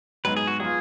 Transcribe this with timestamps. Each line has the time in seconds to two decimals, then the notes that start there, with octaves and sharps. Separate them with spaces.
0.25 G#2 F#3 B3 D#4 B4
0.37 G#4
0.47 F#4
0.60 F#3 B3 F4 G#4